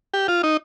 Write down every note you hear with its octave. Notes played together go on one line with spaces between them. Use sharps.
G4
F4
D#4